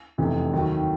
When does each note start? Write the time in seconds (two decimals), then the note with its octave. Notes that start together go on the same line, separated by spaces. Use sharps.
0.18 F1 E2 C3
0.53 D#2 D#3 F#3